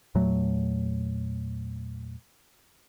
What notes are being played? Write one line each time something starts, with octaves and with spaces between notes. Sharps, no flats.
E2 A#2 F#3 A3